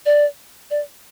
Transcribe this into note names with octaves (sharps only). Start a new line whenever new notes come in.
D5
D5